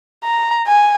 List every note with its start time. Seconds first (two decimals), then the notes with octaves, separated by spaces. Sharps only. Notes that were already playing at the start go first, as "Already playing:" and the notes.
0.24 A#5
0.67 G#5